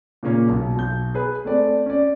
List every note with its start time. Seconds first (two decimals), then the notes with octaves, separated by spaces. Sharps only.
0.23 A#2 C#3 A#3 C#4
0.48 B1
0.76 B1 G6
1.14 G#4 B4
1.44 A3 C4 D5
1.86 C#4 D5